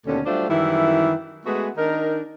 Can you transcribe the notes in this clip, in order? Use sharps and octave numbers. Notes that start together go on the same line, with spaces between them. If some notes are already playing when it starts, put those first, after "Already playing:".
D#2 B2 D3 A3 C#4
F#3 G3 A3 D4 F4 C5
F#2 D#3 E3 G3 E4
G#3 A3 B3 F#4 G#4
D#3 D4 D#4 A#4